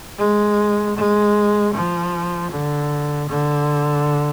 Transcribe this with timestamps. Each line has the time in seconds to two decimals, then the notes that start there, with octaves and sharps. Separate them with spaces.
0.18 G#3
0.96 G#3
1.74 F3
2.51 D3
3.29 D3